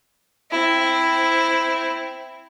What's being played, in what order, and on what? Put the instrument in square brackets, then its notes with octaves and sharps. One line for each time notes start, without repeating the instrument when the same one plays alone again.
[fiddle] C4 E4